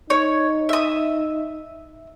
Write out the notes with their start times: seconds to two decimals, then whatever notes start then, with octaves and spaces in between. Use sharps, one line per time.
0.10 D#4 C#5
0.69 E5 D#6